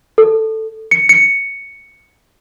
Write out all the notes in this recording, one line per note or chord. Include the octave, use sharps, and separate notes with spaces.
A4
C#7
C#7